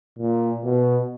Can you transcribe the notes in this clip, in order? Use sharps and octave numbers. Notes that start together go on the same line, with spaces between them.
A#2
B2